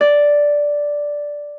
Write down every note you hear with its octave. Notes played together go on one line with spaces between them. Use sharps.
D5